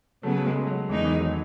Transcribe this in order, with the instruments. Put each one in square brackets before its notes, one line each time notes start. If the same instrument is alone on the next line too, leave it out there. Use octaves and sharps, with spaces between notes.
[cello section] C#3 F#3 B3 [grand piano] A3
[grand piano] A3
G#3
F#3
[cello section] E2 D#3 G#3 D#4 [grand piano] E3
[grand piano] E3
F#3